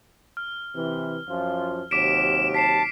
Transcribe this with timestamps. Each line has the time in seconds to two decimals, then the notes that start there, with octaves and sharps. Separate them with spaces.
0.37 F6
0.75 C3 E3
1.27 F#2 F3 F4
1.91 D#2 C3 F#3 D6 B6 D7 E7
2.54 A5 B6 C7 E7